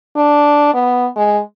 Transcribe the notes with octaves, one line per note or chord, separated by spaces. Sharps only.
D4
B3
G#3